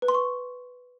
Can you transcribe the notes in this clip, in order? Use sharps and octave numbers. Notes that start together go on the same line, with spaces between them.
B4
C6
C#6